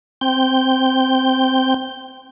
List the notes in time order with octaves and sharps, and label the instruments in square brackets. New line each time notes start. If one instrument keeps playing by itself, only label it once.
[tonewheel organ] C4 G5 G6